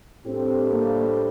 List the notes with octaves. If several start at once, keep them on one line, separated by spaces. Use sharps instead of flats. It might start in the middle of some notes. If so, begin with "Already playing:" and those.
A2 G3 C4 D4 G4 C5
A#3